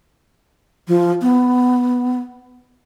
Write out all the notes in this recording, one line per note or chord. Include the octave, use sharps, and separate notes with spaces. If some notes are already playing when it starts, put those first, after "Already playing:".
F3
B3